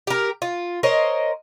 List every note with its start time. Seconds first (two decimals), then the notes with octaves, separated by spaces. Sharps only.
0.07 G4 A#4
0.42 F4
0.83 A#4 C5 C#5 D#5